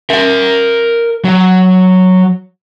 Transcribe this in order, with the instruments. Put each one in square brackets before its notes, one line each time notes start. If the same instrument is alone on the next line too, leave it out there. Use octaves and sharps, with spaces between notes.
[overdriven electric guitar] A#4 E5
F#3